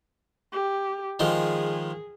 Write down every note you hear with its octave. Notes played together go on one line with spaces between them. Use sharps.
G4
D#3 F3 G#3 G#4